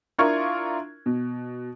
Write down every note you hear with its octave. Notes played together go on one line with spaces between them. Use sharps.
D4 E4 F4 A#4 C#6 G#6
B2